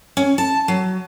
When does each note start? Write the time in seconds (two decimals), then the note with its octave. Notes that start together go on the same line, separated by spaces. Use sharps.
0.17 C#4
0.38 A5
0.68 F#3